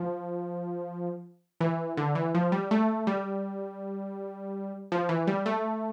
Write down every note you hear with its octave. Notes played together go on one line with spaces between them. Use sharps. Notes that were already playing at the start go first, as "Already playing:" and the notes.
Already playing: F3
E3
D3
E3
F3
G3
A3
G3
F3
E3
G3
A3